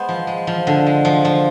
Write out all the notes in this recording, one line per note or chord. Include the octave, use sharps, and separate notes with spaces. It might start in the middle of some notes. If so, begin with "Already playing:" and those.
Already playing: G#3 B3 C5
F3
G#3
F3
D3
G#3
F3
F3